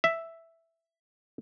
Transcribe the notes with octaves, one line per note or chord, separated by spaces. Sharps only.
E5